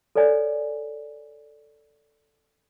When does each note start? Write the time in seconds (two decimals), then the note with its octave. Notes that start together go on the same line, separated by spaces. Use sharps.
0.15 A4 B4 C#5 D5 G#5